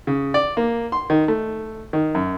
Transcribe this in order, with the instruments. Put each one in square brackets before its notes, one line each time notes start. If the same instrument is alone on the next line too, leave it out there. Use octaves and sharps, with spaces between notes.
[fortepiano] C#3
D5
A#3
C6
D#3
A3
D#3
F#2